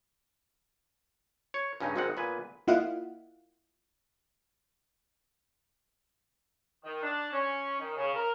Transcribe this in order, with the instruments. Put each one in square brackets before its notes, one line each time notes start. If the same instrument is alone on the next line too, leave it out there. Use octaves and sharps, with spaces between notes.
[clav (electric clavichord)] C#5
G2 C#3 C#4 D#4 D#5
G#1 D#3 G#3 C4 D#4 F#5
A#2 B3 B4 G#5
[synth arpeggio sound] A#3 E4 F4 D#5 F5 F#5
[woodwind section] D#3
D4
C#4
D#3
C#3
A#4